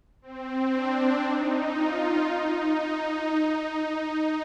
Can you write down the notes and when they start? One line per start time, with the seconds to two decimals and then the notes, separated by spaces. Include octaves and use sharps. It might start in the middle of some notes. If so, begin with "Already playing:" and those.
0.22 C4
0.73 D4
1.23 D#4
1.74 F4
2.25 D#4
2.75 D#4